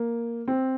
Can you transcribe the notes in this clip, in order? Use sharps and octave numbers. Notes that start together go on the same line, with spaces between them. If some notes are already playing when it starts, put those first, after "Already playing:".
Already playing: A#3
C4